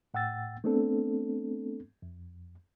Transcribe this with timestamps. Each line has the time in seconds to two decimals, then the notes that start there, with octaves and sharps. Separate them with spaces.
0.14 A2 F#5 G5 E6 A6
0.64 A3 B3 C4 D4 A4
2.02 F2